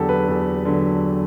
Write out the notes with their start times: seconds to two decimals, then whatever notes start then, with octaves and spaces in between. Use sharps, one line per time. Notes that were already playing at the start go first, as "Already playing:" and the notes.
Already playing: E2 D3 F#3 F#4 G4 A4
0.09 B4
0.28 E2 A4
0.65 D3 F#3